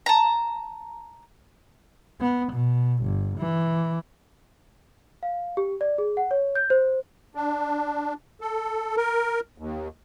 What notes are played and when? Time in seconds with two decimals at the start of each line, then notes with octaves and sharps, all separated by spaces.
0.06 A5 A#5
2.21 B3
2.53 B2
3.03 G1
3.38 E3
5.23 F5
5.57 G4
5.81 D5
5.98 G#4
6.17 F#5
6.31 C#5
6.55 G6
6.70 C5
7.35 D4
8.41 A4
8.97 A#4
9.58 D#2